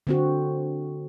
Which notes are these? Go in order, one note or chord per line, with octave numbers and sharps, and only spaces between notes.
D3 C4 F#4